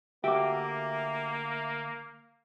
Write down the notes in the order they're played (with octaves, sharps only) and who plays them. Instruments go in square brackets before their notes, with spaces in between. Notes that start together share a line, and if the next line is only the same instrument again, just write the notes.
[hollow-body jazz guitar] D2 F#4 G4 [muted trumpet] A#3 [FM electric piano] E5 D6